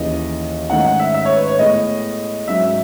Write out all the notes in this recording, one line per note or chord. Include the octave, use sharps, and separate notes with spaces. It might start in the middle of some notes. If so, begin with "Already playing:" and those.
Already playing: D#2 C#3 E3 D#5
G#2 D#3 A3 C#4 F#5
F#5
E5
E5
C#5
B4
C#5
A2 G#3 B3 D#5
G#2 F#3 C#4 E5
E5